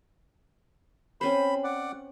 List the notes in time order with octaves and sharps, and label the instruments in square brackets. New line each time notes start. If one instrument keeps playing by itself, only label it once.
[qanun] C4 C#4 C5 [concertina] B5
[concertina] D5 F#5